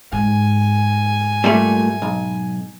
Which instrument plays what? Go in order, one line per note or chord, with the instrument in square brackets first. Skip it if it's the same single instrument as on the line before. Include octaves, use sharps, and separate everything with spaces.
[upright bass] G#2 [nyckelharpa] G#5
[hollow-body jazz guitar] A#2 G3 A3
B1